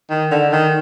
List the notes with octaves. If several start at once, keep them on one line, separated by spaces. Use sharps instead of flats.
D#3
D3
D#3